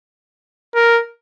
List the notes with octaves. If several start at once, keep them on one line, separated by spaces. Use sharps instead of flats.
A#4